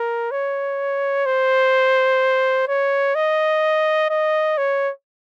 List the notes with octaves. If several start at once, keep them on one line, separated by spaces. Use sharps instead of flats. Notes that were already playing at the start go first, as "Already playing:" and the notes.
Already playing: A#4
C#5
C5
C#5
D#5
D#5
C#5